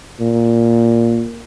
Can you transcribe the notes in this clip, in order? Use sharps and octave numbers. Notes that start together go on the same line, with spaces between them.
A#2